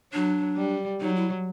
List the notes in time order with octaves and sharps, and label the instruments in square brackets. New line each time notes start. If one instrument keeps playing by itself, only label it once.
[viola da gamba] F#3 [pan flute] D4
[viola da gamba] G3
[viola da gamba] F#3 [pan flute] D#4
[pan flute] E4